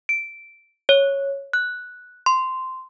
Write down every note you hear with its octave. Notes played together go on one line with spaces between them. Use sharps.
D7
C#5
F#6
C6